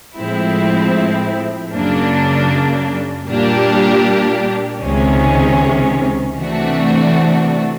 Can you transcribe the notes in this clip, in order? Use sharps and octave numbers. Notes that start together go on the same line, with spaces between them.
A2 F3 G#3 C4 E4
F#2 C#3 F#3 A#3 D4
A#2 G3 A#3 D4 G4
C#2 C3 D#3 G#3 C#4
C3 E3 A3 D4 F#4